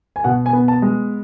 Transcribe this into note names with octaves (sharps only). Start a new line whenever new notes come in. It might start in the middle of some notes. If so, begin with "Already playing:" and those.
G#5
B2 F#5
G#5
B3
A5
G#3